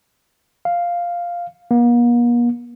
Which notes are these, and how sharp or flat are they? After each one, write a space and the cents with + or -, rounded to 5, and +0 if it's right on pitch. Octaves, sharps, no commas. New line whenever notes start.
F5 +0
A#3 +45